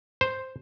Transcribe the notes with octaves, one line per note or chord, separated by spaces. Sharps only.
C5